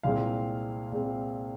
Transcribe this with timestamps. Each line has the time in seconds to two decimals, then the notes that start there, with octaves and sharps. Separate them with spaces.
0.03 C2 A#2 G#3 C4 F5
0.92 A#2 G#3 C4